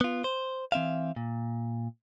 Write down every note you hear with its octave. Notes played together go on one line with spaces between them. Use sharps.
B3 F4
C5
E3 C4 E5 F5
A#2